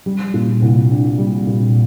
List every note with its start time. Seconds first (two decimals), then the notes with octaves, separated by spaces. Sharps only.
0.06 G3
0.34 A#2
0.62 C2
0.91 D4
1.18 G3
1.47 A#2